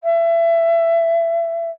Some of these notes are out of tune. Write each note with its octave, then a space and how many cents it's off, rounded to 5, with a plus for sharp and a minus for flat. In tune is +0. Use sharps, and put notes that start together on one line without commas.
E5 +25